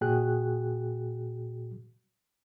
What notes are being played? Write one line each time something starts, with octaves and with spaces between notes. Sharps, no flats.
A#2 F#4 G#4 G5 F#6